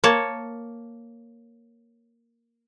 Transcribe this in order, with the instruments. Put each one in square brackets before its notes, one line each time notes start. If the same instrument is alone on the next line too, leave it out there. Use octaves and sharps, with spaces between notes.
[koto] A#3 C#5 A5